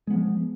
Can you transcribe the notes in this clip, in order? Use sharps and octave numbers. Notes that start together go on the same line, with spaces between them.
F3 G#3 B3